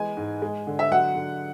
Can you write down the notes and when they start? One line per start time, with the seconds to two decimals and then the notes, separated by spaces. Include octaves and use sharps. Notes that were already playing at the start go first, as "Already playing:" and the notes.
Already playing: E3 G#3 B3 G#5
0.17 G#2
0.42 G#3
0.67 D3
0.79 E5
0.92 F#3 F#5
1.15 D3